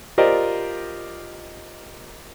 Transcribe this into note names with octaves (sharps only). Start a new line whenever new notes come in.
F4 G4 A#4 C5 D5 D#5